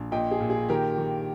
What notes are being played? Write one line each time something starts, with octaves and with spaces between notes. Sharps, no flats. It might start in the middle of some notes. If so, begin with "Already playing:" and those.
Already playing: A#1
A#2 D#5 G5
G#4
A#2
G#4
D#3 G4 A#4
D#3